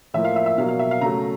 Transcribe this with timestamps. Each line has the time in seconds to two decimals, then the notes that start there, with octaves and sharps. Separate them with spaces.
0.14 A2 F3 A#3 E5
0.25 F5
0.36 E5
0.46 E5
0.58 B2 F#3 A#3 F5
0.69 F5
0.79 E5
0.91 F5
1.01 C#3 F#3 A3 A#5